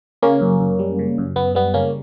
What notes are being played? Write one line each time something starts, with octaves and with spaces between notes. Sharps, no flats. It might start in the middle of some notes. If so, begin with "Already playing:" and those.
C#3 A#3 C#4
F#2
F#2
G3
C#3
F#2
F#2 B3
G3 B3
C#3 A#3 C#4